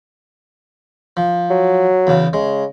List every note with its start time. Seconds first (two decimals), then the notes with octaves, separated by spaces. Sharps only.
1.17 F3
1.50 F#3
2.07 E2 C#3
2.33 C#3 G#3